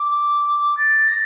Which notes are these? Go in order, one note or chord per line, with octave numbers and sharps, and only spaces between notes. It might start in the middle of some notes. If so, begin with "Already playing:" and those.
Already playing: D6
A6
A#6